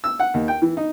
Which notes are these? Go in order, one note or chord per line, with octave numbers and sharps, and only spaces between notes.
E6
F#5
D#2
G5
E3
D#4